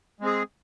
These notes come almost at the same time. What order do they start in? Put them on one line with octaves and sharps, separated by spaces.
G#3 C4 G#4